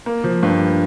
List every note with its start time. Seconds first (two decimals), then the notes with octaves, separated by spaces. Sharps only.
0.06 A#3
0.24 F3
0.43 G2